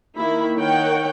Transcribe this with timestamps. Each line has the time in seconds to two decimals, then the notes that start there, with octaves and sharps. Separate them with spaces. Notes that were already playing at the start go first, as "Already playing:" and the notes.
0.16 D#3 A#3 E4 B5
0.57 D#3 C#5 F#5 G5